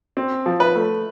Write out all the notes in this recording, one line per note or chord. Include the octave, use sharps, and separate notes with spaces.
C4
F3
B4
A3